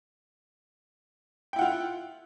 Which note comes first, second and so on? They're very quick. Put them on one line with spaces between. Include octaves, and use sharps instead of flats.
G5 E4 F#5 F4